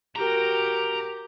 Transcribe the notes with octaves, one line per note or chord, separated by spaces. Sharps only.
F#4 G4 A#4 A#5